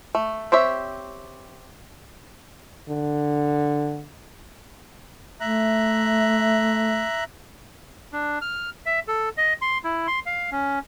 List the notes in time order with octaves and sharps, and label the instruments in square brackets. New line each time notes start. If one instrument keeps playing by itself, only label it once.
[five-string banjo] A3
C4 G4 C#5 E5
[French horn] D3
[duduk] A3 [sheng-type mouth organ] E5 A#5 F#6
[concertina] D4
F6
E5
A4
D#5
C6
E4
C6
F5
C#4